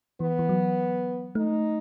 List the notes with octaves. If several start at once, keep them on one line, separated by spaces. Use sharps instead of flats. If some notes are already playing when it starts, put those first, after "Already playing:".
E3 B3
E3
F#3
A3 D#4